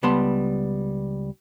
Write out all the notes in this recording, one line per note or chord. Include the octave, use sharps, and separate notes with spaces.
C#2 G3 B3 A5 C6